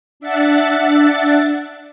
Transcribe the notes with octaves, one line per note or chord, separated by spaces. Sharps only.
D4 E5 F#5 A6